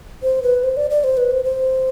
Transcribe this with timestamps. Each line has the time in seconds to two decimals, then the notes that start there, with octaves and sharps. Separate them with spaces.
0.23 C5
0.43 B4
0.63 C5
0.77 D5
0.90 D5
1.04 C5
1.17 B4
1.31 C5
1.44 C5